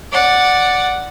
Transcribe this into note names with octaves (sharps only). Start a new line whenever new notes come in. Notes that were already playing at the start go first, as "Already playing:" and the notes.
D5 F#5